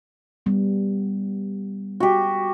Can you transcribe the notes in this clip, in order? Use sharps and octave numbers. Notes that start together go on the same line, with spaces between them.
G3 B3
F#4 G4